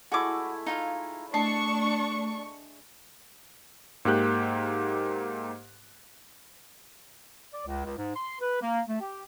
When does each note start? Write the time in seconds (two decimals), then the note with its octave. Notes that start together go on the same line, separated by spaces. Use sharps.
0.12 G#3 A3 E4 F#4 D6
0.66 D#4 F4 F5
1.34 A3 D4 D#5 A5 C#6
4.05 G#2 A#3 G4 F#6 G6
7.53 D5
7.67 C#2
7.85 C#2
7.97 G#2
8.16 C6
8.41 B4
8.62 A#3
8.88 A3
9.01 G4